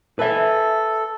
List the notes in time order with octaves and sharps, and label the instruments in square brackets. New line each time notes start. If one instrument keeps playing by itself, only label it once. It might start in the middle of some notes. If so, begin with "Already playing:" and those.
[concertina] A4 [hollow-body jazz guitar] B4 E5